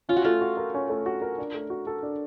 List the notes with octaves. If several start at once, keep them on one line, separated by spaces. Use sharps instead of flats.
C#4 F4
F#4
A3 F4
F#4
A#4
C#4
A3
F#4
A#4
D4
A3
F#4
A4
D4